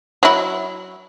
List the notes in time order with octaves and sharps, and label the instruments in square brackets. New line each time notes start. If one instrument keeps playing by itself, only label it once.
[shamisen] F#3 E4